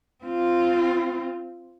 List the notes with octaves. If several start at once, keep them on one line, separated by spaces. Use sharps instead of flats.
C4 F4